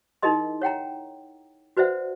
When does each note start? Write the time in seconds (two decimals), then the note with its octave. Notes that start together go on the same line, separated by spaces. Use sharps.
0.23 D#4 E4 G#4 A#4 D#5 C6
0.62 C#5 F#5 G5 A#5
1.77 F#4 B4 C5 D5 E5 F#5